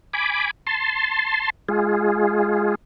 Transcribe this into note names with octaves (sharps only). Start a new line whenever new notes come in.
G#5 B5 D6
A5 C6
G#3 F4 G#4